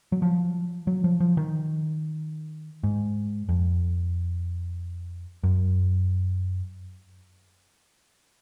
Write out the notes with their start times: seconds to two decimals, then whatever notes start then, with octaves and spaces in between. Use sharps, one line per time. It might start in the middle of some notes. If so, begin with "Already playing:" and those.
0.12 F#3
0.22 F3
0.87 F#3
1.04 F3
1.20 F3
1.37 D#3
2.83 G#2
3.49 F2
5.44 F#2